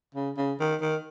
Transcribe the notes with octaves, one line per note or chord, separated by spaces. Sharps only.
C#3
C#3
D#3
D#3